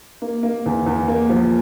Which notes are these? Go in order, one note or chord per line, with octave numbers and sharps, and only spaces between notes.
A#3
A#3
E2
E2
A#3
F3